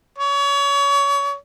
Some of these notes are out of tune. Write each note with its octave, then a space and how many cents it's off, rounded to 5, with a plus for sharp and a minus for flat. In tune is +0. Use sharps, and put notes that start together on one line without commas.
C#5 +30